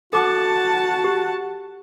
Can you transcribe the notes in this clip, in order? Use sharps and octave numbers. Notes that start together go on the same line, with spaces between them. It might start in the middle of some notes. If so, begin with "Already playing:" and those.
F#4 A4 F#5 A5 D6
G4